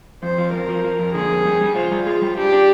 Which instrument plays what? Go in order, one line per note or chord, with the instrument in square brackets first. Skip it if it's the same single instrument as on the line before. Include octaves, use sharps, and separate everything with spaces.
[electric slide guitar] F2 [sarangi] C5
[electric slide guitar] F3
[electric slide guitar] F2 [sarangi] A#4
[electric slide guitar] F3
F3
F2
[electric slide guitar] D3 [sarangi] G#4
[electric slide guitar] F2
G3
G3
[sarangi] F4 [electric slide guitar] C5
[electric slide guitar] G3
G#4
G3
[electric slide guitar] D4 [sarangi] G4
[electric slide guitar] D4